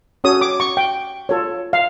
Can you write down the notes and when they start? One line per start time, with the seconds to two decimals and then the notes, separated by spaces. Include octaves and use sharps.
0.24 C#4 F#4 A4 C#5 D#6
0.41 D6
0.60 C#6
0.77 G5
1.29 F4 A4 C#5
1.73 F5